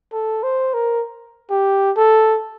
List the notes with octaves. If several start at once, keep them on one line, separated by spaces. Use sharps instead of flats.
A4
C5
A#4
G4
A4